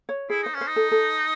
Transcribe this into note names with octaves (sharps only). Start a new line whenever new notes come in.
C#5
E4 G#4
D#4 C5
C#4
C5
D#4
A4
A4